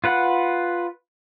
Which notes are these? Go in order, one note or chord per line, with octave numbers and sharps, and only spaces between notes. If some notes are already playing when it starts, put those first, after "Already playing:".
F4 B4 F#5